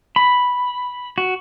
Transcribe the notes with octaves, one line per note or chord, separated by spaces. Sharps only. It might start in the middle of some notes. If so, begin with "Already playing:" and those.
B5
F#4